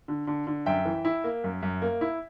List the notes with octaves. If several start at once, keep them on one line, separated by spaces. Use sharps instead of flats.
D3
D3
D3
F#2 E5 G5
E3
E4
A#3
F#2
F#2
A#3
E4